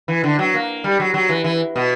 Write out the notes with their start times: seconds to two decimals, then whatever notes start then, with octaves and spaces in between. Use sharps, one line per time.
0.08 E3
0.24 D3
0.39 F#3
0.54 A#3
0.84 G3
1.00 F#3
1.14 F#3
1.29 E3
1.44 E3
1.76 B2